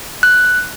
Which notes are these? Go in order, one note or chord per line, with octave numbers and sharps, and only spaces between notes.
F#6